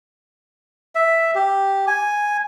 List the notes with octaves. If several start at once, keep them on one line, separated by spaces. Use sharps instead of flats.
E5
G4
G#5